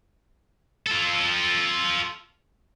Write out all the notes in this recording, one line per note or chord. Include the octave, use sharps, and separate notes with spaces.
F4 A4